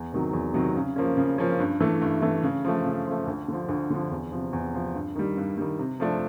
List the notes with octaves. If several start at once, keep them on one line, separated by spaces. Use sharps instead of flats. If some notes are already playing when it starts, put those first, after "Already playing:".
Already playing: E2
C3 D#3 F#3
E2
C3 D#3 F#3
C#3
F3 A#3 C#4
C#3
F3 A#3 C#4
G2
E3 A3
G2
E3 A3
C#3
F3 A3
C#3
F3 A3
D2
D3 F3
D2
D3 F3
E2
C3 F3
E2
C3 F3
G2
D#3 G3
G2
D#3 G3
C3
F3 A3 D4